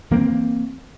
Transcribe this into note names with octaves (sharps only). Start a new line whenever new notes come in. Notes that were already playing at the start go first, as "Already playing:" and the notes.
E3 A#3 C4